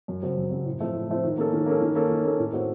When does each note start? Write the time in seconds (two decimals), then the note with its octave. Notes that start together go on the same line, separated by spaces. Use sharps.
0.08 F#2
0.22 C#3 F#3 C4
0.37 F#2
0.51 C#3 F#3 C4
0.66 A2
0.80 F3 A3 C4
0.95 A2
1.09 F3 A3 C4
1.23 D#3
1.38 A#3 C#4 A4
1.53 D#3
1.66 A#3 C#4 A4
1.81 D#3
1.95 A#3 C#4 A4
2.10 D#3
2.24 A#3 C#4 A4
2.39 A2
2.53 A3 C4 F#4